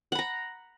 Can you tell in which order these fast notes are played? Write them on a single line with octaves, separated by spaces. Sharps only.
F#5 B5 A#5